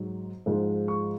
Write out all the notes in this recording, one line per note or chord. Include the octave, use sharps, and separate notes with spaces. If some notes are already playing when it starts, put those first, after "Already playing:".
Already playing: G#2 F#3
G#2 F3 G#3
C#6